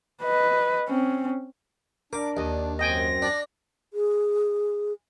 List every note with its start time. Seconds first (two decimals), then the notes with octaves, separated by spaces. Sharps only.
0.23 B4 D#5
0.89 C4 C#4
2.13 D4 A#4 D6
2.37 D#2 D#5
2.79 F#2 C4 D#5 G5 G#5 A#6
3.22 D4 D5
3.93 G#4